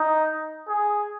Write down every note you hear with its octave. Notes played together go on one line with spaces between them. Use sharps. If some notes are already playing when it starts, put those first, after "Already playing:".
Already playing: D#4
G#4